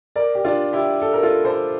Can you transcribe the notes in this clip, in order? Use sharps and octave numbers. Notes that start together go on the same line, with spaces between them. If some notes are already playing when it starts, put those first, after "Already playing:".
A#4 D5
G4
D4 F4
E4 G4
A4
A#4
F4 A4
A4 C5